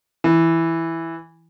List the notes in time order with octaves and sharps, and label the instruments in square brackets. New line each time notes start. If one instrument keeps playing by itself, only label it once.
[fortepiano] E3